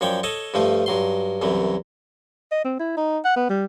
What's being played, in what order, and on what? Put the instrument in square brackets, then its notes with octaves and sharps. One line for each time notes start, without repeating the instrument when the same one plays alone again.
[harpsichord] F#2 F3 C#5 D5 G5
A4 C#5 D#5 A5
G2 F3 A3 F4
G2 F#3 C6
C2 F#2 E3 F#3
[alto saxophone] D#5
C4
E4
D#4
F#5
B3
G3